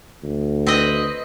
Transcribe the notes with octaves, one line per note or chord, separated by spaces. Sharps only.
D2
C4 B4 D#5